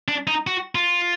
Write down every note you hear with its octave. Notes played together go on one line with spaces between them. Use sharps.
D4
D#4
F#4
F4